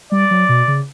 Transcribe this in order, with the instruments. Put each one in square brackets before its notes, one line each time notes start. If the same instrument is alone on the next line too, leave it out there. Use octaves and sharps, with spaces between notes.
[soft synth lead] G3 [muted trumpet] D5
[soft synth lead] F#3
B2
C#3